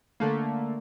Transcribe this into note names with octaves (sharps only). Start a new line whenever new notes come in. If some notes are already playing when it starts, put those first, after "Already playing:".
D3 A3 A#3